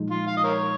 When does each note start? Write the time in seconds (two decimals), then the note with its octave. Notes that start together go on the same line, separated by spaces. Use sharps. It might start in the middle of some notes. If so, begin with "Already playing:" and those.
Already playing: A#2 F3 G#3 D#4
0.11 F4
0.27 F5
0.37 D#5
0.44 A#4 C#5